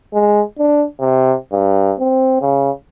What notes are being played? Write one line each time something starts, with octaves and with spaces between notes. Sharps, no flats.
G#3
D4
C3
G2
C4
C#3